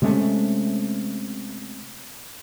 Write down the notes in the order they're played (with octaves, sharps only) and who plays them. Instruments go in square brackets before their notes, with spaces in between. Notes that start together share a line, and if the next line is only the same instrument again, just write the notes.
[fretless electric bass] C3 G#3 A3 C#4